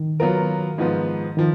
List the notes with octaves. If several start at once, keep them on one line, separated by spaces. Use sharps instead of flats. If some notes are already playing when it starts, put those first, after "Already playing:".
Already playing: D#3
F#3 B3 F4 A#4
G#2 F3 B3
D#3 F3